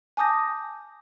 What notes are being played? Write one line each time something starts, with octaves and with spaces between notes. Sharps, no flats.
G#5 A5 D6 D#6 G6 A#6